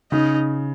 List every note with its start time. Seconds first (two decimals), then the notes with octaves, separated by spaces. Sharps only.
0.12 C#3 D#4